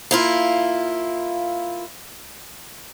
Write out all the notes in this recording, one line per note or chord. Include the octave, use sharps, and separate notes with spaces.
A#3 E4 F4